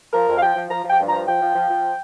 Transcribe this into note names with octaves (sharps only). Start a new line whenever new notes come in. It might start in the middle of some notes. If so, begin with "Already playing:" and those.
F3 A#4
F2
F5
F3 G5
F3
F3 A#5
F3
G5
G2
F3 A#5
F3 G5
F3
F3
F3